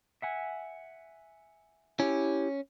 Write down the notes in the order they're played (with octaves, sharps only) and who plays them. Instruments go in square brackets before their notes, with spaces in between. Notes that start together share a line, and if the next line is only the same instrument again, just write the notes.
[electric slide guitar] E5 F#5 G#5
[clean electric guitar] C#4 [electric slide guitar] E4 G4